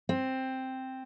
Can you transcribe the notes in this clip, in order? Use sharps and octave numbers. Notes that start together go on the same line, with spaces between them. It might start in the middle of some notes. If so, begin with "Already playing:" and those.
C4